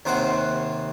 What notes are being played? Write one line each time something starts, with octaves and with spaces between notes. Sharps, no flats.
D#2 C3 C5 F#5